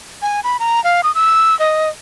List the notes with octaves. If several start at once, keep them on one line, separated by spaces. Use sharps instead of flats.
G#5
B5
A#5
F5
D#6
E6
D#5